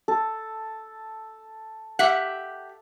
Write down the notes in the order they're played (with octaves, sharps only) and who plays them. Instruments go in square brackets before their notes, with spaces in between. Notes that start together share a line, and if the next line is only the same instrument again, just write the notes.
[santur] A4
[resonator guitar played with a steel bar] G4 E5 F#5